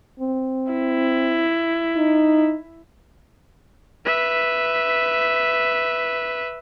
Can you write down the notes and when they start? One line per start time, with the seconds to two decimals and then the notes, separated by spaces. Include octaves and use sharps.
0.20 C4
0.72 E4
1.97 D#4
4.05 B4 E5